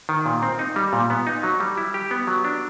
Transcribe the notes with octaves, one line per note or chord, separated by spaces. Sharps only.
D#3
A#2
C4
D#4
G3
A#2
B3
D#4
F#3
G3
E4
G4
B3
F#3
D4